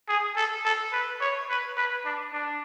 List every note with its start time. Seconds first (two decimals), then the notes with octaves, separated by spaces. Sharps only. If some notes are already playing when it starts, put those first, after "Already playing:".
0.09 G#4
0.36 A4
0.65 A4
0.93 B4
1.21 C#5
1.49 B4
1.77 B4
2.05 D4
2.33 D4